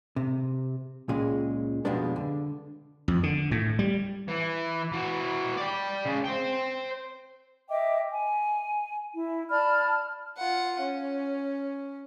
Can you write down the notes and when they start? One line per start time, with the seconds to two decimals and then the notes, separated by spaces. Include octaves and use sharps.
0.16 C3
1.09 C#2 A#2 C#3 G#3
1.85 F2 B2 G3 G#3 B3 D4
2.16 D3
3.08 F2
3.23 D3
3.51 A2
3.79 G3
4.28 E3
4.92 E3 F#4
5.57 D5 G5
6.06 C#3 G#3
6.25 C5 G5
7.69 D#5 E5 G5 D6
8.11 G#5
9.14 E4
9.51 D5 A5 B5 F6
10.37 F4 F#5
10.79 C#4